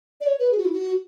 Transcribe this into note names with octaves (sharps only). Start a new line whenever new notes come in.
D5
C#5
B4
G#4
F#4
E4
F#4